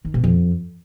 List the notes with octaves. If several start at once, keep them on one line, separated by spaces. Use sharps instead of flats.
D#3
B2
F2